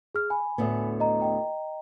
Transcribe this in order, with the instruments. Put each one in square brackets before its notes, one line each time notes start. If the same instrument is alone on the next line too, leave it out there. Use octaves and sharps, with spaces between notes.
[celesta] G#4 F6
G#5 B5
[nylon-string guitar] D2 A2 B3
[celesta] D#5 A#5
D#5 G5 A#5